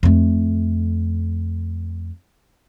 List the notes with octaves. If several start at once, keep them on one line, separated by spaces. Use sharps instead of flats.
F2 A3